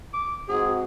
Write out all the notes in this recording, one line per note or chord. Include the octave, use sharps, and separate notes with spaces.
D6
G#2 C4 F#4 G#4